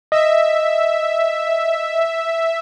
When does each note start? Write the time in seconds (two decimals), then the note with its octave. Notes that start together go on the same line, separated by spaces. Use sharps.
0.12 D#5 E5